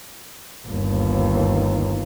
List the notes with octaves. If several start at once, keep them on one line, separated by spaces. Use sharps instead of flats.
G1 D#2